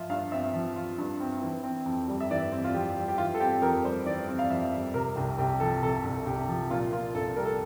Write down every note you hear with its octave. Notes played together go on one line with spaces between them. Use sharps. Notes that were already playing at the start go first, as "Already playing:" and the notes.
Already playing: F3 F4 E5
G2 F5
C4 E5
F3
F4
G2
C4
E3
C4
F2
G3
E5
E3 D5
C4
F4
F2 G4
G3
G4
E3 F4
A4
C4 G4
F2 A#4
G3 C5
E3 D5
C4
F5
F2 E5
G3
C3 A#4
C2 G4
C2 G4
F3 A4
C3 A4
C2
C2 G4
F3
A#2 F4
A#3 F4
C2 A4
G3 A#4
A4